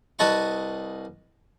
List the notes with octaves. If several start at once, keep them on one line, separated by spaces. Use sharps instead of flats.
C2 B4 D#5 A5 A#5 C#6